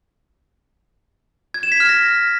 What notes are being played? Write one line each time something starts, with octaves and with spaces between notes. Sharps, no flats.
G#6
E7
B6
F6
A#6